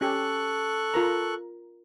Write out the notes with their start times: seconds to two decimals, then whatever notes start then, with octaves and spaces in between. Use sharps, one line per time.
0.01 C#4 G4 A4 C#6 F#6
0.94 F4 A#4 A#5